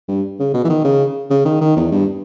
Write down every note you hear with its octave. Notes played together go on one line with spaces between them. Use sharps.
G2
C#3
B2
E3
D#3
C#3
C#3
D#3
D#3
E2
G2